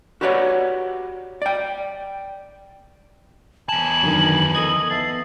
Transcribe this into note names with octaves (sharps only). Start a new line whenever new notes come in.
F#4 G4 B4 C#5 D5 F#5
D5 G5
E2 G#5 A5 F#7
F#2 D3 D#3
A4 D#5 D#6 G#6
B3 E5 A5 C7